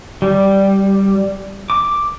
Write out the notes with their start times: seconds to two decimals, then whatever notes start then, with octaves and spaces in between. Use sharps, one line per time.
0.22 G3
1.70 D6